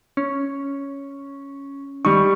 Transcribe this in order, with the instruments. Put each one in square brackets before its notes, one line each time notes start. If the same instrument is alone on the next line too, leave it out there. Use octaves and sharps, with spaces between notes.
[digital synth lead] C#4
[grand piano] G3 C#6 [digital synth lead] D#4